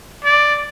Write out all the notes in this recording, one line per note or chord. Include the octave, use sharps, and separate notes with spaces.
D5